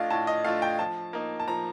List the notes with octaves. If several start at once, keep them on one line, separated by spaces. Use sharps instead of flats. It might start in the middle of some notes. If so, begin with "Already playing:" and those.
Already playing: A2 A3 D4 F4 D#5 F5
A2 A5
D#5
A3 D4 F4 F5
G5
F3 A5
A#3 D#4
A5
F3 A#5